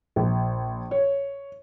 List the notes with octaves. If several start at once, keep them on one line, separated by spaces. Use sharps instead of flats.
A#1
C#5